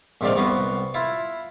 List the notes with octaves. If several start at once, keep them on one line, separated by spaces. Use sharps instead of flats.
A#1 G#2 C3 D#3 D5 F5
C2 B3 F#4 C6
E4 F4